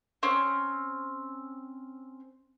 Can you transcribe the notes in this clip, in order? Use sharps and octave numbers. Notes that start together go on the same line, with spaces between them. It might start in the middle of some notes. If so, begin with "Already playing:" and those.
C4 C#4